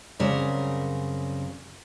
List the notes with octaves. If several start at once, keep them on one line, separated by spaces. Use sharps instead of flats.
F#2 C#3 G3 C4 A#4